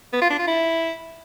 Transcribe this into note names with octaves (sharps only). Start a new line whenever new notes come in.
B3
F4
D4
F4
E4